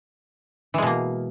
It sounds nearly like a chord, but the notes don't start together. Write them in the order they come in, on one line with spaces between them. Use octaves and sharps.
E3 G#3 B2 A#3